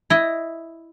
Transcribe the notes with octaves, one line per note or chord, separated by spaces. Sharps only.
E4 D#5